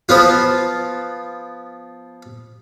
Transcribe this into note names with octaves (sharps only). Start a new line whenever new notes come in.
F3 B3 F4